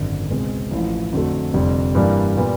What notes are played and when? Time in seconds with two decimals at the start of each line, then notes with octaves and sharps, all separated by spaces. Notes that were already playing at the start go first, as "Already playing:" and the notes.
Already playing: G#1 F#2 D3
0.30 C#2 B2 G#3 C4
0.71 A1 A2 F3
1.13 F2 D3 F#3 A3
1.54 F1 F2 D3 G3
1.95 G2 E3 G3 A#3 D4
2.37 A#2 G3 B3